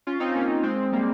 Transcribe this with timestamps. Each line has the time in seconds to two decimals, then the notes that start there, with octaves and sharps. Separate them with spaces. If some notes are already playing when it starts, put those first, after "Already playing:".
0.07 C#4 F4
0.20 C4 D#4
0.35 A#3 C#4
0.63 G#3 C4
0.92 G3 A#3